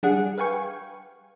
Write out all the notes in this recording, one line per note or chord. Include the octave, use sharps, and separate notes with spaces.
G3 D4 G#4 F#5
B4 F5 G5 G#5 C#6